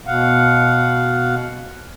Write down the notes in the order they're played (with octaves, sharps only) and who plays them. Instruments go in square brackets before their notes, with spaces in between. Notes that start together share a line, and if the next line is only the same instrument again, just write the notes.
[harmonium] B2 F5 F#5